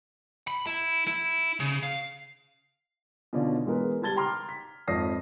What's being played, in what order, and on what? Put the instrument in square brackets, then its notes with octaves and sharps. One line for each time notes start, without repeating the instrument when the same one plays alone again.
[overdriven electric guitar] B5
E4
E4
C#3
F5
[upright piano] B2 D3 D#3 C#4 D4 F4
E3 G#3 B3 A#4 B4
G3 A5 G#6 A6 G7
G5 A#5 C6 D6 F6
B6
G#1 F2 C#5 D#6 A#6 C7